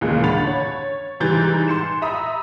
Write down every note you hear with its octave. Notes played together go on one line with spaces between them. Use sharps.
D#2 A#2 C#3 E3 G#3
G1 D4 F#5 B5 A6 F7
C#5
G#2 C3 E3 G3 G6 A6
C6 C#7 E7
E5 A#5 B5 D#6